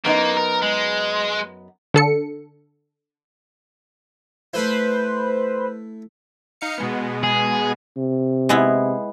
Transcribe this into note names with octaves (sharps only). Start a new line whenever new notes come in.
F#2 A#3 B3 D#4
A#4
G#3
D3 A4 C#7
A3 E4 B4 C5
D#4 F5 C#7
B2 G#3 B3
G#4
C3
G#3 B3 E4